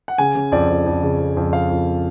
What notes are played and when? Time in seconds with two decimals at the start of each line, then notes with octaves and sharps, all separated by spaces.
0.08 F#5
0.18 C#3 G#5
0.35 C#3
0.52 F2 D5
0.69 F2
0.86 F2
1.03 C#3
1.19 F2
1.37 F2
1.53 F2 F5
1.70 F2